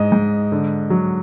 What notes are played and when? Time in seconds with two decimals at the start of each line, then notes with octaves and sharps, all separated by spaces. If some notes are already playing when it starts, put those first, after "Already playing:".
Already playing: G#2 D#5
0.12 G#2
0.52 D3
0.90 F#3